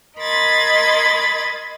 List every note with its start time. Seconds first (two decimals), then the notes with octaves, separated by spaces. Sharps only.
0.17 A#4 D#5 B5 C6 G#6 A6